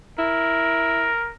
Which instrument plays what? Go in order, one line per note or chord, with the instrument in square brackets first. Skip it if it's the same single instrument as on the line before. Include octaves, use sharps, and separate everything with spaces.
[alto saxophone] E4 [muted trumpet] A#4